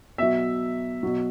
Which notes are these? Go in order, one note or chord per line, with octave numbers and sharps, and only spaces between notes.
B2 F#3 E5
B2 F#3